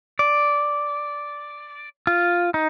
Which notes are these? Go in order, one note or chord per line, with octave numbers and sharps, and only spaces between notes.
D5
F4
D#4